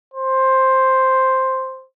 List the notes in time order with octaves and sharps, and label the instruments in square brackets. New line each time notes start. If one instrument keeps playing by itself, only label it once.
[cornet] C5